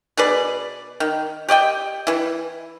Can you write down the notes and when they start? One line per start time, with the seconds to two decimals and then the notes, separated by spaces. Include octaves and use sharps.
0.17 B2 G#4 B4 D5
1.00 D#3
1.48 G4 D5 D#5 G5
2.07 E3 E4